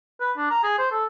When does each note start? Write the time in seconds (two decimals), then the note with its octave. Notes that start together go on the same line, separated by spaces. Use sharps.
0.20 B4
0.37 D4
0.50 A#5
0.63 G#4
0.78 C5
0.92 A4